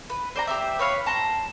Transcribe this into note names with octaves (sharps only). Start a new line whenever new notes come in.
B4
C5 D5 A#5
G4 C5 E5
B4 C#5 F5 B5
A5 A#5 C6